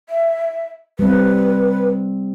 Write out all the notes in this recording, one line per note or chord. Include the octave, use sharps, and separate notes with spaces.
E5
G3 C4 B4